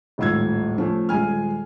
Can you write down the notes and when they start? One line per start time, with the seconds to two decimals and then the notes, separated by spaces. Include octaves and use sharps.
0.18 D#1 G#1 A2 F4 E6 G#6
0.78 F3 A3 C#4
1.09 D#1 G#3 F4 G#5 F6